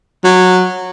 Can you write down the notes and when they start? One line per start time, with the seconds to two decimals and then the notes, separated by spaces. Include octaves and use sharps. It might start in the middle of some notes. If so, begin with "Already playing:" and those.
0.24 F#3